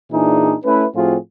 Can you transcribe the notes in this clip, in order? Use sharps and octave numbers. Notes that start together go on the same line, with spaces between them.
A#2 E3 D4 D#4 G#4
A3 C#4 E4 B4
A2 F3 C4 F4 F#4 G#4